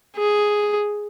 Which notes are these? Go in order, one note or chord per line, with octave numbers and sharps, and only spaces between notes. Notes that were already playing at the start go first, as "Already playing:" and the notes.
G#4